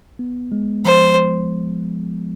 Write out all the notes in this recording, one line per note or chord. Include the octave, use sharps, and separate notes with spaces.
B3
G#3
F3 C5